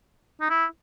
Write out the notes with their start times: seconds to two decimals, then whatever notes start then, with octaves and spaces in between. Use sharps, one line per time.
0.41 D#4
0.50 E4